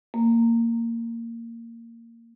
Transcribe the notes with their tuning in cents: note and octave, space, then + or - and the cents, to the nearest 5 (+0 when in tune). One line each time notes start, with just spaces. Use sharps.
A#3 -15